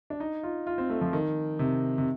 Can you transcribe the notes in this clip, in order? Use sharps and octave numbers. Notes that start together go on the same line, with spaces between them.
D4
D#4
F4
F4
C4
A3
F3
D#3
C3
C3